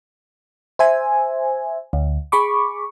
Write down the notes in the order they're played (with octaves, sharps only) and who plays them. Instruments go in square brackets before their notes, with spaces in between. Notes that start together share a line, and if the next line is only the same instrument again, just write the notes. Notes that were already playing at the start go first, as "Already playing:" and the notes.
[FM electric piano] C5 E5 G#5
D2
G#4 B5 C#6 D6